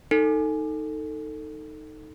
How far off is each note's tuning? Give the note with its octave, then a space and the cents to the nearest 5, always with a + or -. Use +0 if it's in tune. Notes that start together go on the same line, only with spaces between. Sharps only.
D#4 +0 A4 +15